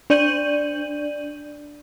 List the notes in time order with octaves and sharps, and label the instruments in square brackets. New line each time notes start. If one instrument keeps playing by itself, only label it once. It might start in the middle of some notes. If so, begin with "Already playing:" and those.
[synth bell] D4 D5 G6 D#7 F#7